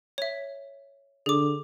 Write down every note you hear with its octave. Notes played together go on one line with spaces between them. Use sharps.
C#5 E5
D3 G#4 D6